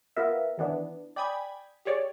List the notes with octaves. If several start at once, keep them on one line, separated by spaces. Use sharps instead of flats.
B3 F4 A#4 E5
D#3 E3 B3 D4
D5 G5 G#5 B5 D#6 G#6
G4 G#4 C#5 D5